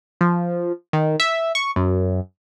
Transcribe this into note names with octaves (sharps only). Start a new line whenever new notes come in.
F3
D#3
E5
C#6
F#2